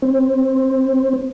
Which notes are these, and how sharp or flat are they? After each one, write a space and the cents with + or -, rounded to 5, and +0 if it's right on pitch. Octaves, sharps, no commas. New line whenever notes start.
C4 +15